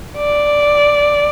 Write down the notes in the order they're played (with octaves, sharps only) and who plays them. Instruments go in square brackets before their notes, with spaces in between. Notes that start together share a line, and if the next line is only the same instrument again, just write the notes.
[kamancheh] D5